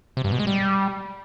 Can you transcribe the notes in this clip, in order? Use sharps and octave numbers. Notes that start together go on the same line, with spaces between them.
C3
G2
B2
G#3
G3